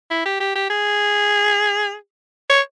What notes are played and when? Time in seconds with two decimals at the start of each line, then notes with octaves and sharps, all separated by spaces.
0.11 E4
0.26 G4
0.40 G4
0.55 G4
0.70 G#4
2.50 C#5